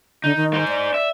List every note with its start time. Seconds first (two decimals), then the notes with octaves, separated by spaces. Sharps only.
0.24 D3 D#4
0.36 D#3
0.54 D#4 C5
0.68 D5
0.94 E5